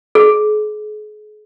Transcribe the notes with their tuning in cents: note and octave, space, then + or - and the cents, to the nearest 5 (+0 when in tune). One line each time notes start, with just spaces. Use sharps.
G#4 +40